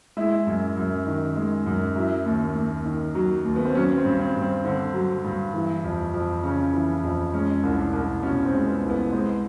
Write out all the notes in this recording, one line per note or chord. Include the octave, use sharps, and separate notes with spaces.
G#3 E4
F#2
F#2
D#3
G#3
F#2
F#3 E4
D#2
D#2
D#3
F#3
D#2
B3
C4
F#3 C#4
C4
G2
C4
G2
C4
D3 C4
F#3
G2
E3
F2
F2
C#3 C#4
E3
F2
G#3 C#4
C2
D4
C2
B2 C#4
C4
G#3
B3
C2
B3
G#3 C4